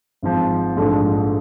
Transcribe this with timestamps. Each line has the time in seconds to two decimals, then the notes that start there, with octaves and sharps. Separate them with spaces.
0.23 G#1 G#2 F3
0.76 A#1 G#2 F3 A3 D4